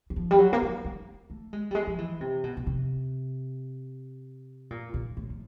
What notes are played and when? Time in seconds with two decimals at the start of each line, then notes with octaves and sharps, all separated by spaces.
0.10 E3
0.16 F3
0.31 G3
0.39 F#3
0.53 A#3
0.62 A3
0.85 G3
1.30 A3
1.53 G#3
1.71 G3
1.75 G#3
1.87 F3
1.98 E3
2.21 C3
2.44 B2
2.57 B2
2.67 C3
4.70 A#2
4.94 A#2
5.17 A2
5.30 A2